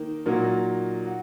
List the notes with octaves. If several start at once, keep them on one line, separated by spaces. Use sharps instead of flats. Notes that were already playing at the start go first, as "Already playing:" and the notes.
Already playing: D#3 A#3 D#4 A#4
A#2 F#3 D#4 F#4 A#4
F#4